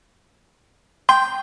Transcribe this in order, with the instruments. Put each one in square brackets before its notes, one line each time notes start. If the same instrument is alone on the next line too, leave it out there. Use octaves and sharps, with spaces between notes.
[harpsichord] G5 [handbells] C6